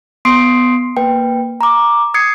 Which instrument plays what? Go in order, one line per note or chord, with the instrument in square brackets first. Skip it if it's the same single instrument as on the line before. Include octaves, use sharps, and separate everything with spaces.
[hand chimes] B3 C6 D#6 C7 D7
A#3 B4 G5
A#5 D6
D#6 G#6 C7 C#7